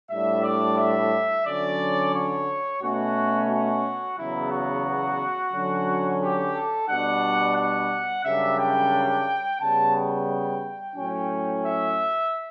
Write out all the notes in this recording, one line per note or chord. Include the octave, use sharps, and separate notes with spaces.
A2 G3 D4 E5
D5
E5
D3 F#3 C#4 D5
C#5
B2 A3 C#4 F#4
F#4
E2 C#3 F#3 B3 E4
F#4
D3 F#3 C#4
G4
A4
B2 G3 D4 F#5
F#5
F#2 C#3 G3 D4 E5
G5
C#3 G3 B3 A5
G5
A2 F#3 C#4
E5